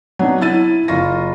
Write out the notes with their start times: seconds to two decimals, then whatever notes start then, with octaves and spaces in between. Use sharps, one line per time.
0.19 F#3 B3 D4 D#4
0.41 E4 E6 A6 D#7
0.88 F#1 F4 C#6 A#6